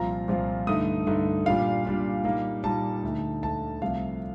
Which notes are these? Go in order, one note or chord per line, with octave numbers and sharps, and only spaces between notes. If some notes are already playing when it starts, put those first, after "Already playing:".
Already playing: C2 A#2 F3 C4 F4 A#5
C2 A#2 F3 C4 F4
G2 D3 A3 D#4 D#6
G2 D3 A3 D#4
A#2 G3 D4 F4 F5
A#2 G3 D4 F4
A#2 G3 A#3 D#4
A#2 G3 A#3 D#4 A5
D2 D3 A3 D#4
D2 D3 A3 D#4 A5
C2 C3 F3 A3 F5